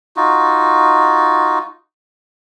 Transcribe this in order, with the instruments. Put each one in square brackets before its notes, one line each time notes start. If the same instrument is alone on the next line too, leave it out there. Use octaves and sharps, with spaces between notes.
[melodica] D#4 F4 F#4